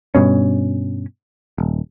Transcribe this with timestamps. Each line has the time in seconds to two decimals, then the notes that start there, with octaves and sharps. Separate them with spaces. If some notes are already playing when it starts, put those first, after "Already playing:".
0.15 G2 B2 C#4
1.58 D#1